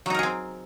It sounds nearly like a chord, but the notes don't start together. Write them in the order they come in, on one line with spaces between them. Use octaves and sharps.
F#3 D#4 A#4 G#4 C4